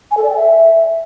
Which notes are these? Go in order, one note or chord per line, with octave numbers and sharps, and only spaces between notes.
G#5
A4
D5
G5
E5